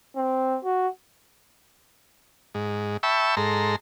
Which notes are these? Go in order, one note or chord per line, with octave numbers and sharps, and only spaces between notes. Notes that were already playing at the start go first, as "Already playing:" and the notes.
C4
F#4
G#2
E5 G5 A5 B5 C#6 E6
G#2 A4 A#5 C6